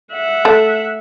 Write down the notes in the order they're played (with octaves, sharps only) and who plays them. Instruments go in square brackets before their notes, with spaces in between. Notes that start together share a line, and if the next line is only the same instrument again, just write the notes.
[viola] E5 F#5
[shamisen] A3